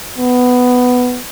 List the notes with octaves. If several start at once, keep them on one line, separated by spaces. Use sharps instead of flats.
B3